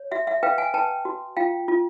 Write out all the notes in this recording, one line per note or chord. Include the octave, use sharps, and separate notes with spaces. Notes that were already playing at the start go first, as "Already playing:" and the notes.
Already playing: C#5
F#4 E5 F#5
E5 F#5
B4 F5 G5
F#5 G#5
B4 G5 A5
F#4
F4 F5 G5
F4